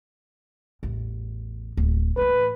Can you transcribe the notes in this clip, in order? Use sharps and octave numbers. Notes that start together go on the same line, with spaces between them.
A1 E2
D1
A2 E3 B4